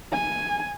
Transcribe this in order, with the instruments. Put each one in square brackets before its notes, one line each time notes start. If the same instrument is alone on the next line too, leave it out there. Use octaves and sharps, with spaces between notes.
[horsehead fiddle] G#5